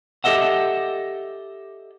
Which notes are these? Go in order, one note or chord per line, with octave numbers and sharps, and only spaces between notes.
G4 A4 D#5 E5 F#5